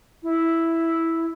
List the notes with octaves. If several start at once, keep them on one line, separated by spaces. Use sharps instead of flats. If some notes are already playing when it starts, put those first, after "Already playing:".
E4